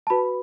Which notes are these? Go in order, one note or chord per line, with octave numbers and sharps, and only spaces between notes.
A5
F#4 B4 B5